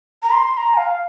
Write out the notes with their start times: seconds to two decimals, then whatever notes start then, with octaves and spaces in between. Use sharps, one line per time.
0.23 A#5
0.32 C6
0.53 C6
0.57 A#5
0.74 G#5
0.77 F5